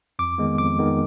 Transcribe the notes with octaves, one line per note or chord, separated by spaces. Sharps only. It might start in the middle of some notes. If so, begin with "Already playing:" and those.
F2 D6
D#3 G#3 B3
F2 D6
D#3 G#3 B3